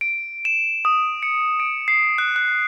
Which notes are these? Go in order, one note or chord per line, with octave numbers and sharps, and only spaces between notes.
D7
E7
D#6
C#7
D7
C7
F#6
F#6